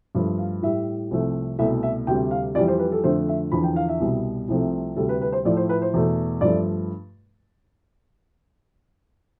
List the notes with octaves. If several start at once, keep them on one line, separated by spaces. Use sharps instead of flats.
G2 F3 A3
F5
A2 G3 E5
C2 C3 F3 A3
C2 B2 A3 E5
E5
D2 C3 G3 G5
F5
F2 E3 G3 D5
C5
B4
A4
F2 D3 A3 C5
E5
E2 D3 F3 B5
G5
F5
E5
C2 B2 G3
C2 C3 F3 A3
D2 C3 G3 A4
B4
B4
C5
A2 F3 A3 D5
C5
B4
C5
E2 B2 A3
G2 F3 A3 D5